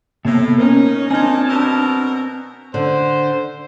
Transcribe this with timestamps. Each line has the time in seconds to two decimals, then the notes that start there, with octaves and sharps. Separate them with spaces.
0.25 A2 C3 A#3 B3 C#5
0.58 C#4 D#4 A#4
1.10 A#2 C4 D4 D#4 G#5 A5 F6 G#6
1.49 B2 A#4 E6 G6 A#6
2.74 D3 C5